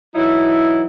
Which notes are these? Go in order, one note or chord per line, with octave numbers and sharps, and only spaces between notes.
E3 F#3 D#4 E4